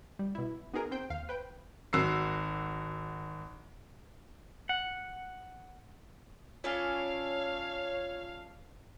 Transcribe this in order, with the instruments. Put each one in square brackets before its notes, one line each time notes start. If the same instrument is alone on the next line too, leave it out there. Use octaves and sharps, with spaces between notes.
[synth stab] G3
B2 E4
B3 D#4 F#4 G#4 A#4
C4 C5 G5
D#2 F5
B4 C5 G5
[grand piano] G#1 F#4 E6 C7
[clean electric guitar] F#5
[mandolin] C#4 D4 A4 [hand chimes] F4 [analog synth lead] C#5 [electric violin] F5